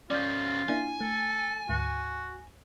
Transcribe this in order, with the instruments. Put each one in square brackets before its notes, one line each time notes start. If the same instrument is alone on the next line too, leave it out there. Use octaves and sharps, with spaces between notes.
[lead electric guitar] F3 C#4 [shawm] F4 [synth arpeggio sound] D5 G6
[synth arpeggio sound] A#3 D4 E4 [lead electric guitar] G#5
[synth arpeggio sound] A3 [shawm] A4
[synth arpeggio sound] D2 G#2 [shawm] F#4